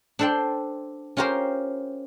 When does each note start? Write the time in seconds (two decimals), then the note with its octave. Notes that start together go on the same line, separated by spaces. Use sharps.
0.19 D4 A4 C5 D5 G5
1.17 C#4 F4 G4 A#4 C5